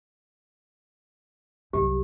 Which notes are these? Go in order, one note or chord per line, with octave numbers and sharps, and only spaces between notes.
C2 F#2 G4